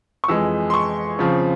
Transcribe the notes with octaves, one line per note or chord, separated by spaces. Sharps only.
C#6
F2 E3 G#3 E6
C6
C#6
C#3 F3 C4